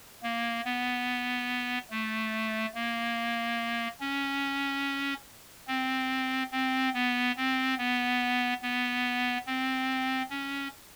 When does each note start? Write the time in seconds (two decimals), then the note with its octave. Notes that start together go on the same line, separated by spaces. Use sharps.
0.23 A#3
0.65 B3
1.90 A3
2.74 A#3
4.00 C#4
5.68 C4
6.52 C4
6.94 B3
7.37 C4
7.78 B3
8.62 B3
9.47 C4
10.30 C#4